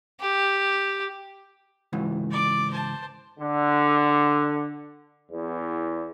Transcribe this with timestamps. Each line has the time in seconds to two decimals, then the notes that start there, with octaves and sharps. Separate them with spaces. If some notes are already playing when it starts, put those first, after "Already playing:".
0.21 G4
1.93 C#2 G#2 E3
2.31 D5 D6
2.71 C5 A5
3.39 D3
5.31 E2